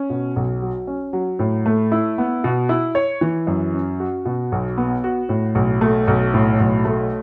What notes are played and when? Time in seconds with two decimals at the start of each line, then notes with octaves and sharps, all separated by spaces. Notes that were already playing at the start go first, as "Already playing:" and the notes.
Already playing: C#4
0.10 B2
0.36 B1
0.62 F#3
0.87 C#4
1.13 F#3
1.39 A2
1.66 A3
1.92 E4
2.18 B3
2.44 B2
2.69 E4
2.95 C#5
3.21 E3
3.47 F#2
3.74 C#4
4.00 F#4
4.25 B2
4.52 B1
4.77 B3
5.04 F#4
5.29 A2
5.55 B1
5.81 A3
6.08 B1
6.34 A2
6.60 B1
6.85 A3